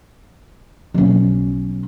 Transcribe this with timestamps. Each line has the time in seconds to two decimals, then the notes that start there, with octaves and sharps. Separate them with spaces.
0.94 B1 C#4